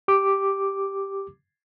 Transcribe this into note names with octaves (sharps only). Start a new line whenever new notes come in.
G4 D6